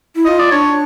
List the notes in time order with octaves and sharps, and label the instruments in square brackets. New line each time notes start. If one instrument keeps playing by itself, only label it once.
[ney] E4
[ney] F4 [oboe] D#5
[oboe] D5
[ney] D4 [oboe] C#5